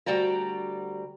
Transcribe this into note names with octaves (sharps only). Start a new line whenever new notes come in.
D2 G3 F#4 D5 G5 A#5